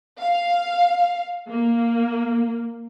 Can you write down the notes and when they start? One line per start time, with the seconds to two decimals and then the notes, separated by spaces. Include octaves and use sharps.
0.20 F5
1.49 A#3